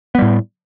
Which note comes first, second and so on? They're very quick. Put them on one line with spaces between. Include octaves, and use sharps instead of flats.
B3 G3 A2